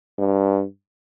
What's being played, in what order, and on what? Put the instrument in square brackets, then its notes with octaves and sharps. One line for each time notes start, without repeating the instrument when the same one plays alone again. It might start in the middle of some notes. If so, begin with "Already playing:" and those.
[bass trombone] G2